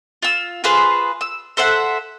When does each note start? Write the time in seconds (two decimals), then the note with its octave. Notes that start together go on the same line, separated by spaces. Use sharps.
0.23 F4 E6
0.64 F4 G#4 B4 C5
1.21 E6
1.57 A4 C5 E5 F#5